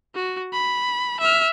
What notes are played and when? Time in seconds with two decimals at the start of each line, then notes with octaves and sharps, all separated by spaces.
0.15 F#4
0.53 B5
1.20 E5 F6